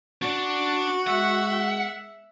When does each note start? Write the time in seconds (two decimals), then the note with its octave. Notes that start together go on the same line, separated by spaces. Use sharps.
0.22 D4 F#4 D5
1.07 G#3 E5 F#5